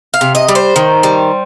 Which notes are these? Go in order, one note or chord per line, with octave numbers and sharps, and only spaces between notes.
F5
C3
D#5
G3
C5
D#3
G3